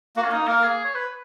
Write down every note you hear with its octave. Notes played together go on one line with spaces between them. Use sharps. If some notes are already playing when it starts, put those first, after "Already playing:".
A#3 F#4
C#4
A#3 D#4
A#3 A#4
G#4
C#5
B4